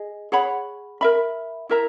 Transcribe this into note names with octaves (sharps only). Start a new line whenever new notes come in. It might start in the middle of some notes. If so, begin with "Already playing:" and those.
Already playing: G#4 D#5
G#4 C#5 F#5 B5
A#4 E5 B5
E4 A#4 E5 A#5